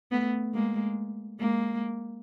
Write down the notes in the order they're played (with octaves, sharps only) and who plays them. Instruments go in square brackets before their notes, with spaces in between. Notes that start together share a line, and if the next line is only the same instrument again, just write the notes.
[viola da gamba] A3 B3
G#3 A#3
G#3 A#3